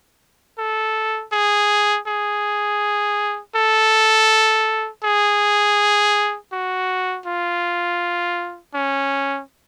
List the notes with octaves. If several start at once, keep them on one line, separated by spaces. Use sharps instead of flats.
A4
G#4
G#4
A4
G#4
F#4
F4
C#4